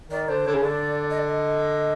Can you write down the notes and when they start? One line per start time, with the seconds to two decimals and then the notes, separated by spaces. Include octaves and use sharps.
0.10 D#3 D5
0.28 D3 C5
0.46 D3 C#5
0.55 C#3
0.62 D3 D5
1.10 D#5
1.18 D5
1.28 D#5